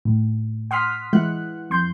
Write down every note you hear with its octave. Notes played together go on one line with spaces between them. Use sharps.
A2
F#5 C6 D#6 F6 B6
E3 G#3 E4 F#5 F#6
F2 C6 G6